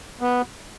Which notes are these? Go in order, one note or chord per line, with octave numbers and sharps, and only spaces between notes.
B3